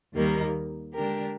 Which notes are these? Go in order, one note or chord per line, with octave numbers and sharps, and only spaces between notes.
D#2 D#3 G3 A#3 D#4
D3 G#3 D4 G4 A#4